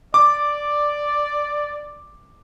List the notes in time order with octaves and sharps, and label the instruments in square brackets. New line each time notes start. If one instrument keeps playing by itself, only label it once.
[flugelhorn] D5 [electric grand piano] D6